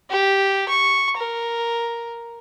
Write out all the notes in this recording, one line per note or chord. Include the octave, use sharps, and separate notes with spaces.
G4
C#6
A#4